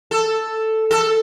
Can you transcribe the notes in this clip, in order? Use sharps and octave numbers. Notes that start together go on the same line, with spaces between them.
A4
A4